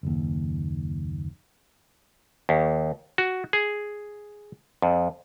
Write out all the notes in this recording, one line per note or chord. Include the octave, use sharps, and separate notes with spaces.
F#1 D#2
D#2
F#4
G#4
F2